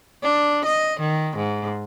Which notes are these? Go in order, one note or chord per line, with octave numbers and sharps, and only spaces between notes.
D4
D#5
D#3
G#2